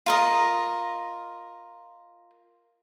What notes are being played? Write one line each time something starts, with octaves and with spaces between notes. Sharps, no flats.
F4 A#4 D#5